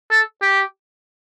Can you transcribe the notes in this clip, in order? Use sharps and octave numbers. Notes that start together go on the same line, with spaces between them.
A4
G4